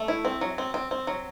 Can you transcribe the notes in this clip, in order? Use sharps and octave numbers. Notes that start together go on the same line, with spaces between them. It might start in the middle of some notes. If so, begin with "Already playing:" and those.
Already playing: A3
E4
C4
F#3
C4
C4
C4
F#3